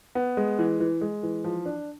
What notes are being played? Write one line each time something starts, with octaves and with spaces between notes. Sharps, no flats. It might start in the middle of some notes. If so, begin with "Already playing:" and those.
B3
G#3
E3
E3
G#3
E3
F3
D4